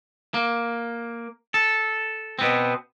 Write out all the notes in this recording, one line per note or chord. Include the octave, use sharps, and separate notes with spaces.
A#3
A4
B2 B3 C4